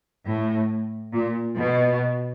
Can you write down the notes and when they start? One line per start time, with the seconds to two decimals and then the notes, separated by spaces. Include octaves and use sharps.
0.25 A2
1.13 A#2
1.56 B2